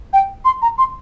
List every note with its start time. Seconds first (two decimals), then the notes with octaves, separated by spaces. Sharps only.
0.13 G5
0.45 C6
0.62 A#5
0.78 C6